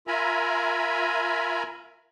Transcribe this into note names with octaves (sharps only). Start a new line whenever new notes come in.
F4 A#4 E5 G#5 A#5 B5